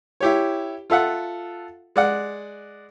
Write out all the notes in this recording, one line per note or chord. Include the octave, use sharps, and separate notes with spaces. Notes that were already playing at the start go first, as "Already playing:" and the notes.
E4 G4 C#5
F4 A4 E5 F#5
G#3 D5 F#5